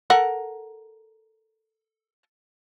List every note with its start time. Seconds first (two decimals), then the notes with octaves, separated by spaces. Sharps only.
0.10 A4 A#4 F#5